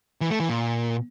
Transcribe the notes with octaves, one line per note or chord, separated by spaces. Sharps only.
E3
A3
E3
A#2